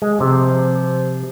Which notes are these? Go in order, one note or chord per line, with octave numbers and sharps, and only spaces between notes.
G#3
C3 F3